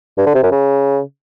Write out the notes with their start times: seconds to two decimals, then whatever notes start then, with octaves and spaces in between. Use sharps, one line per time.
0.18 G2
0.26 D3
0.35 C3
0.43 F#2
0.51 C#3